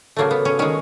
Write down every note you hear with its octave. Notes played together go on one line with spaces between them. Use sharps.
C#3 F#3 A3 A#3
B3
C#4
D#3 G#3 C#4